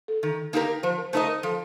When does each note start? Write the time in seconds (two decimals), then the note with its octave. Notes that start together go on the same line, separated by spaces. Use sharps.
0.08 A4
0.23 D#3 A4
0.53 A#3 D#4 G4 A#4
0.83 F3 C5
0.98 A#4
1.13 A3 D#4 A#4 C5 D#5
1.28 A#4
1.43 F3 A4